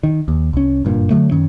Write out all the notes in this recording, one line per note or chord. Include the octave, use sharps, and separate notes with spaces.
D#3
D#2
C2 C#4
F#1 G2 A#2
D3 F#3 A3
F#2 D#3 C#4